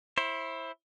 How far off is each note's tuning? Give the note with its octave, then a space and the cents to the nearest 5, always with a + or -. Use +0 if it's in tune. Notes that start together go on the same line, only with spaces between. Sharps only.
E4 +0 C5 +30